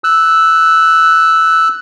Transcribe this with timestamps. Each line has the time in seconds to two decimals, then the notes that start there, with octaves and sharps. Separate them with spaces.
0.04 E6 F#6